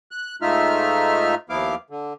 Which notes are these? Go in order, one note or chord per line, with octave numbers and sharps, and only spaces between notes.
F#6
G#2 A3 D#4 F4 E5 F6
D#2 F3 B3 E4 F5 D6
D3